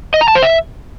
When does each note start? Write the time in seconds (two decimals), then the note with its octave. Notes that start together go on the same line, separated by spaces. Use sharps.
0.14 D#5
0.21 A#5
0.28 A5
0.35 C5
0.43 E5